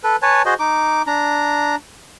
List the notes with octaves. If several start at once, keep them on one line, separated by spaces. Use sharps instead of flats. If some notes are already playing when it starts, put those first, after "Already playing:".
A4 B4
B4 C#5 G#5 A5
F#4 G#4 C5 D#5
D#4 D6
D4 A#5